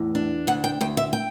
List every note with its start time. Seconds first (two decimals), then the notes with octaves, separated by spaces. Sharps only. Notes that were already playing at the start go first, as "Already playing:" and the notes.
Already playing: E2 A2
0.15 D4
0.47 D2 F#5
0.64 G5
0.81 D2 G5
0.97 E5
1.13 G5